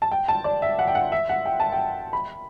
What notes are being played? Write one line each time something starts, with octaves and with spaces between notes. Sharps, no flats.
A5
G5
A5
D5
E5
F#5
G5
F#5
E5
F#5
G5
A5
G5
B5